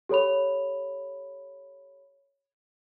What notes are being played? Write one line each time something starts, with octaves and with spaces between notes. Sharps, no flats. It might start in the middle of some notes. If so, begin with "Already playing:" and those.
G4 A4 C#5 B5 F7